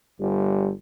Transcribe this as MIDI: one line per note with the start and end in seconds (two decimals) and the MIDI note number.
0.20 0.72 31
0.20 0.71 55